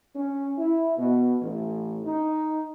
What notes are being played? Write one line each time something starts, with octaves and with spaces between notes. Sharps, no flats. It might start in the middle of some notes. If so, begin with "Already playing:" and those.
C#4
E4
B2
A1
D#4